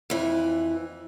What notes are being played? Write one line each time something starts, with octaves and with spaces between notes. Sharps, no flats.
F2 E3